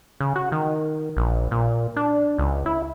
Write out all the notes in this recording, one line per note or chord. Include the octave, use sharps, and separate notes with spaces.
C#3
F#4
D#3
A#1
A#2
D4
C#2
E4